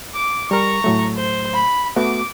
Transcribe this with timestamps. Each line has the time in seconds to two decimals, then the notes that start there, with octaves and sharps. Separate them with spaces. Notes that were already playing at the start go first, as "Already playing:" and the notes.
0.14 D6
0.51 G3 A#4 A#5 C#6
0.84 A2 F#3 A3
1.17 C5
1.54 B5
1.97 A3 B3 F#4 D6